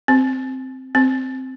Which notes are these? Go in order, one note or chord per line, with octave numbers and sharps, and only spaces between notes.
C4
C4